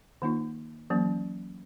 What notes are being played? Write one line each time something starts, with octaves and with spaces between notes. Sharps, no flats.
D#3 A#3 D#4 F4
E3 F#3 A#3 C#4